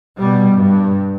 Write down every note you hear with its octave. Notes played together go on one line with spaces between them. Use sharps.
B2 G3
G2